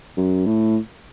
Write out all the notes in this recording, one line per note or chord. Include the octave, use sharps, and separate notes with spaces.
F#2
A2